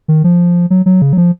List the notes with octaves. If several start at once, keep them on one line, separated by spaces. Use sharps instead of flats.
D#3
F3
F#3
F#3
C#3
F#3
F3